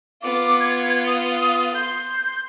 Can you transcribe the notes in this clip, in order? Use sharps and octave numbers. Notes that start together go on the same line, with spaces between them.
B3 F4 D6
G#6
D#6
C6 G6